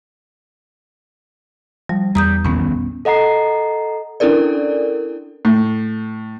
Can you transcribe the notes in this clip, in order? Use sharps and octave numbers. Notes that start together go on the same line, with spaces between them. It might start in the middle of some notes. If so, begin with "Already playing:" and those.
F3 G3
E2 G3 A#5 D#6 G6
A#1 D#2 A#2 B3 C#4
A4 D#5 F#5 A#5 C7
C#4 D4 E4 A4 A#4 D5
A2